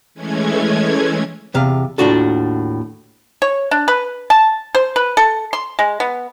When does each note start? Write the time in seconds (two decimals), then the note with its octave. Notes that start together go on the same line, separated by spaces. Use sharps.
0.15 E3 G#3 A3 C#4 G#6
1.54 E2 C3 F5
1.98 D#2 A2 D4 F4 F#4 A4
3.42 C#5
3.71 D4
3.88 B4
4.30 A5
4.75 C5
4.96 B4
5.17 A4
5.53 C6
5.79 G#3
6.00 B3